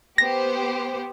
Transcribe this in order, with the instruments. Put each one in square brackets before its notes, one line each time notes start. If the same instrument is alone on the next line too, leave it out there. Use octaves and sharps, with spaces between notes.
[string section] B3 G4 C5 [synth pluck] A#6